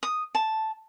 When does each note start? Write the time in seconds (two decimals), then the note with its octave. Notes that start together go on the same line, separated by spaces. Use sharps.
0.03 D#6
0.35 A5